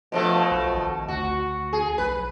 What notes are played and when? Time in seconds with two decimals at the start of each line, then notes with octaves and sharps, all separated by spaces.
0.12 B2 F3 A3
0.51 B1
0.74 G#1
1.08 D2 F#4
1.73 G#4
1.98 B1 B4